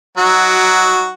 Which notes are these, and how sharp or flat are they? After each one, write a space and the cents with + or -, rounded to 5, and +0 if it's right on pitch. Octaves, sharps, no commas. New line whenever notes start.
F#3 +15 D#4 +0 F#4 +0